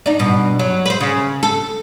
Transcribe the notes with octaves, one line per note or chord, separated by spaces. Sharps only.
D4 D#4
G2 B2
F#3
B4 C5
C#3
A4